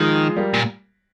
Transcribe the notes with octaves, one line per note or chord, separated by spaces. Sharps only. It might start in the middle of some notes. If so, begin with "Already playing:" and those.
Already playing: D#3 F3 G#3
G3 A#3
A#2